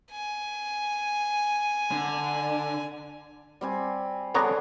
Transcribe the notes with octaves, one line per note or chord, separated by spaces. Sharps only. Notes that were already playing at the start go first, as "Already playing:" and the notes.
G#5
D3
G3 C4 G#5
D3 B3 D4 G#4 C#5 A#5